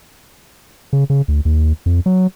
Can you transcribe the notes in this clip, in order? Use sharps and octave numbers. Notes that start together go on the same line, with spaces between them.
C#3
C#3
D2
D#2
F2
F#3